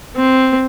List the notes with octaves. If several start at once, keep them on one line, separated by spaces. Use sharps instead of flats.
C4